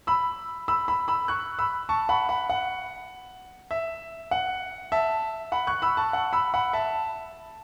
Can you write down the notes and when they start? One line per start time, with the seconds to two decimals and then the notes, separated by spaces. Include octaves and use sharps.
0.07 B5 E6
0.68 B5 E6
0.88 B5 E6
1.08 B5 E6
1.28 C#6 F#6
1.59 B5 E6
1.89 A5 C#6
2.09 F#5 B5
2.29 F#5 B5
2.50 F#5
3.71 E5
4.31 F#5
4.92 E5 A5
5.52 F#5 B5
5.67 C#6 F#6
5.82 B5 E6
5.97 A5 C#6
6.13 F#5
6.33 B5 E6
6.54 F#5 B5
6.73 E5 A5